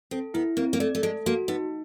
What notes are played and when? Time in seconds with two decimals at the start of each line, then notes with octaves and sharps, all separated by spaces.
0.11 C4 A4
0.34 B3 E4
0.57 A#3 C4
0.73 A#3
0.80 A3 D5
0.95 A3
1.03 G#3 A4
1.26 A#3 F#4
1.48 B3 D#4